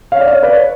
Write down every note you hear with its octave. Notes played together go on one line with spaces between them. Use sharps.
C#5 F5
D5
C#5 F5
B4 D5
C#5